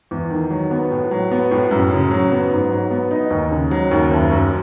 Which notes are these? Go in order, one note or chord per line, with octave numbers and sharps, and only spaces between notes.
E2
D#3
F#3
B3
A2
F#3
B3
A2
F#2
C#3
F#3
B3
G#2
F#3
B3
D#4
D#2
C#3
F#3
D#2
F#1
F#2